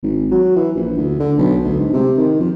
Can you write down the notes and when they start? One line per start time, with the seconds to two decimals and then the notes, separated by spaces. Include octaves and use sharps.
0.03 G#1
0.31 F#3
0.56 E3
0.76 A#1
0.97 D2
1.20 D3
1.38 B1
1.64 D2
1.80 G#2
1.93 C3
2.17 D#3
2.40 F2